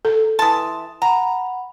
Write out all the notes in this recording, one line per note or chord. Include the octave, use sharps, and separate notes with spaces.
A4
E3 A5 C6 D#6
F#5 A#5 B5